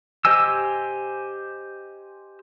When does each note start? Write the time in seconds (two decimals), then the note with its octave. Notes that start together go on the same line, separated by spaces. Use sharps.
0.25 G4 C5 D#5 G#5 E6